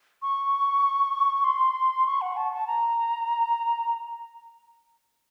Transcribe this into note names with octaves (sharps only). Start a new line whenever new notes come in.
C#6
C6
C#6
F#5
A5
A5
A#5